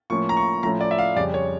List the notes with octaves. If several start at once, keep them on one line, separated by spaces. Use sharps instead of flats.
A2 F3 A#3 C#4 C#6
A#5
C#6
A2 F3 A3 C#4 A#5
D5
E5
F5
F2 C#3 G3 C#4 D5
C#5